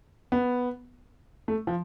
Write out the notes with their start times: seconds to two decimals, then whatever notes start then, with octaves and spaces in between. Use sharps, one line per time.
0.32 B3
1.48 A3
1.67 F3